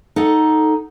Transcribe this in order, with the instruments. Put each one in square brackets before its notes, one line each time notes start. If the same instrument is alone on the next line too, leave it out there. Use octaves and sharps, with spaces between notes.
[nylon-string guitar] D#4 A4 F#5